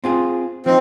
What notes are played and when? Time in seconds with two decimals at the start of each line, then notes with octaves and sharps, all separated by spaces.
0.04 C4 F4 G#4
0.66 F3 C4 D#4